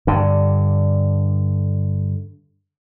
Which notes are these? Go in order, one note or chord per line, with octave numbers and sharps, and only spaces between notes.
G2 D3